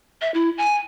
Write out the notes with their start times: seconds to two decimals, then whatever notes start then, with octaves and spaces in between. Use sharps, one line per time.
0.22 E5
0.34 E4
0.58 G#5